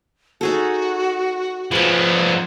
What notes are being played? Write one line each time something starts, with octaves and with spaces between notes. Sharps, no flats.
D#4 F#4 G#4 A4
F3 B3 G#4 C#5